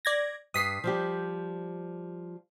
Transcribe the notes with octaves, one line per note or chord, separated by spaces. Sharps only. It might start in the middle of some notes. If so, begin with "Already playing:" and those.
D5 G#6 A#6
G2 D#6 B6 C7
F3 G3 G4